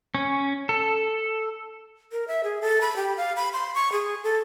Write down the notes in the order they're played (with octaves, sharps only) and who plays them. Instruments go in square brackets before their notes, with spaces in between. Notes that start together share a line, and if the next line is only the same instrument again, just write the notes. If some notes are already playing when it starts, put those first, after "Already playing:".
[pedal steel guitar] C#4
A4
[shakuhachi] A#4
E5
G#4
A4
B5
G4
F5
B5
C6
C#6
G#4
A4